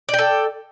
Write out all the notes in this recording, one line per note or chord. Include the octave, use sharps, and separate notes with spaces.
A4 D5 G5